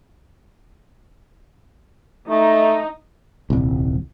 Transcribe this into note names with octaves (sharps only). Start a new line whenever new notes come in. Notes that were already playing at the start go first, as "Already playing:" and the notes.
A3 D#4
D#1 C2